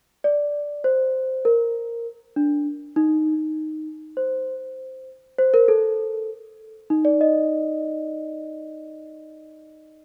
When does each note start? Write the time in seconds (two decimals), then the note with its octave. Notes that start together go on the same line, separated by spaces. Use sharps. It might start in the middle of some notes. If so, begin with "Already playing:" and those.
0.24 D5
0.84 C5
1.45 A#4
2.36 D4
2.96 D#4
4.17 C5
5.38 C5
5.54 A#4
5.68 A4
6.90 D#4
7.05 D5
7.21 D#5